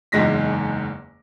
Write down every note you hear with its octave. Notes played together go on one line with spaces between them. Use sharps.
F#1 E2 G#2 G#3 A#6 B6